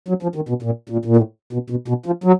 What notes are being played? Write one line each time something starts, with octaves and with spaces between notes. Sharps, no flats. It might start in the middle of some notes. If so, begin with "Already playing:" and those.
F#3
F3
D#3
B2
A#2
A#2
A#2
A2
B2
B2
B2
F3
F#3